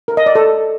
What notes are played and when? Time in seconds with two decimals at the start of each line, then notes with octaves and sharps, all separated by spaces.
0.08 A#4
0.17 D#5
0.26 D5
0.35 A4